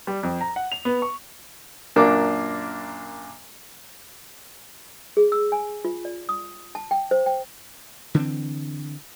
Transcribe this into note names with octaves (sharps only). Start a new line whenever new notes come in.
G3
F2
A#5
F#5
F7
B3
C#6
F#2 A#2 A#3 D4 D6
G#4
E6
G#5
F4
D5
D#6
A5
G5
C5
G5
D3 E3 A#3 C4